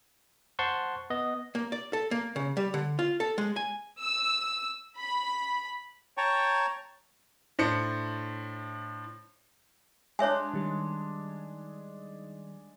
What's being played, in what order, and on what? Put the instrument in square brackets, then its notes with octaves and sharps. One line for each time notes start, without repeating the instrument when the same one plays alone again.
[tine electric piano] C5 F#5 A5 C6 C#6
B3 D#5
[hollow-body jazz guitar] A#3
D5
A4
A#3
C#3
G3
D3
F4
A4
G#3
G#5
[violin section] E6
B5
[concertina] C#5 G5 A5 A#5 C#6
[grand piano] A2 D4 C5 C#7
[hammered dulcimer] G#3 D4 [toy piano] C#5 E5 G#5
[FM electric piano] D#3 G3 D#4